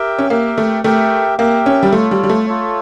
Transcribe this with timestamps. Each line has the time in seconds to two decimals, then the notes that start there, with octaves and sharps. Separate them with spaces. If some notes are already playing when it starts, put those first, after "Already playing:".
Already playing: G4 A#4 E5 G5
0.18 C#4
0.30 A#3 G4 A#4 E5 G5
0.58 A3
0.84 A3 G4 A#4 E5 G5
1.38 A#3 G4 A#4 E5 G5
1.66 C#4
1.83 G3
1.92 A3 F4 A4 C#5
2.11 G3
2.23 G3
2.29 A3
2.47 F4 A4 C#5